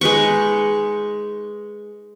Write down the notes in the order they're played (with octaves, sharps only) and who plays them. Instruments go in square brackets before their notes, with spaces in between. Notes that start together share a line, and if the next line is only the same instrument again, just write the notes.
[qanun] G#3 D#4 B4 C#6